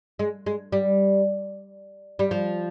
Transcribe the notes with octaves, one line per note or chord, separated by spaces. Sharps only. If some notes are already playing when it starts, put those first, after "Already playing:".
G#3
G#3
G3
G3
F3